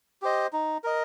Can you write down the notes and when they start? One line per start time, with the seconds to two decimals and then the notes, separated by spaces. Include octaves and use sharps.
0.22 G4 C5 D#5
0.53 D#4
0.84 A#4 D#5